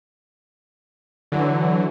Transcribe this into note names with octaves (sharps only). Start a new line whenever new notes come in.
D3 E3 F#3